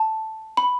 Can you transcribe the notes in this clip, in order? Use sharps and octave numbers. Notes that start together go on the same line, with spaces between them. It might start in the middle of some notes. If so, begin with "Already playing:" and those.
Already playing: A5
B5